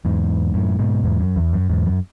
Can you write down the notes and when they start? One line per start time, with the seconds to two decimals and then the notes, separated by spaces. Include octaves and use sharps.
0.05 E2 G#2
0.54 F#2 A2
0.79 G#2 B2
1.04 E2 G#2
1.20 F#2
1.36 E2
1.53 F#2
1.69 E2 G#2
1.86 F#2